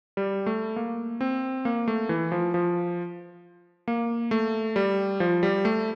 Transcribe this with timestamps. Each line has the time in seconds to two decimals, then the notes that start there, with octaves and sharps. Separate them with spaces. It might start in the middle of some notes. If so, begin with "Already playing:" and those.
0.17 G3
0.46 A3
0.76 A#3
1.21 C4
1.65 A#3
1.88 A3
2.09 E3
2.32 F3
2.54 F3
3.88 A#3
4.31 A3
4.76 G3
5.20 F3
5.43 G3
5.65 A3